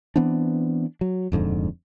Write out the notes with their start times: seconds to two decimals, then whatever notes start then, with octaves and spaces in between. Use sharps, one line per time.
0.16 E3 B3 C4 D4
1.01 F#3
1.32 D#1 F2 G#2 D3